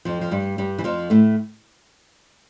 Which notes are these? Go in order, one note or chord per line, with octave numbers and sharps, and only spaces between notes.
F2 F3
F3
G2 G3
G2 G3
E3
F2 F3
A2 A3